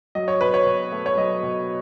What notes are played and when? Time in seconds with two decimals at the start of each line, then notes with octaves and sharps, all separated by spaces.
0.15 F#3 D#5
0.28 C#5
0.41 B2 B4
0.54 C#5
0.66 B2
0.92 A3
1.06 C#5
1.17 F#3 D#5
1.43 B2